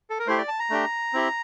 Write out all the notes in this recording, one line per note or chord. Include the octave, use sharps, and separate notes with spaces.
A4
A#4
A3 E4 G4 C5
D5
A5
A#5
A3 D4 G4
C4 E4 G4